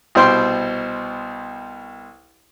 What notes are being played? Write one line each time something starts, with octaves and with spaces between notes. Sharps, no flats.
C2 B2 C5 G5 C6